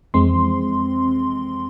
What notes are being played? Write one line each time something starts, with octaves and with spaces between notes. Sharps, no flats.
F2 E3 G#3 C4 C6